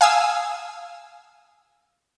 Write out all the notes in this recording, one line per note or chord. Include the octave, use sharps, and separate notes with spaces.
F5 G#5 D#6 E6